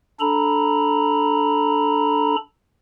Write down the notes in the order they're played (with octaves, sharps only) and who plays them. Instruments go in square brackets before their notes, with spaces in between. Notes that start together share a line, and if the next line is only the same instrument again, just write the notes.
[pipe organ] D4 A4 A#5 B5